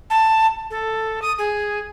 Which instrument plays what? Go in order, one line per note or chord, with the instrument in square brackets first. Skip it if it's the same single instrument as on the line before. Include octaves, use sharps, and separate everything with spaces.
[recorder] A5
A4
D#6
G#4